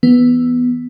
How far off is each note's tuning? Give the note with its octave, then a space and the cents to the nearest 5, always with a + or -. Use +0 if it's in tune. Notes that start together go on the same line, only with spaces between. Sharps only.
E3 +0 B3 +0